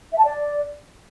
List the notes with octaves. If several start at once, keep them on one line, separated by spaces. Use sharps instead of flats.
E5
A5
D5